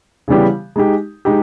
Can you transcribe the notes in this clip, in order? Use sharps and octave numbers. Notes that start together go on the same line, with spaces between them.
C#3 E3 G3 B3 G4
G#3 D#4 G4
G#3 D#4 G4